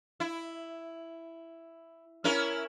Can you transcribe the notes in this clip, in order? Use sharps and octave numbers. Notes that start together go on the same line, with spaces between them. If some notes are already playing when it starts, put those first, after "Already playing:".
E4
C#4 E4 A#4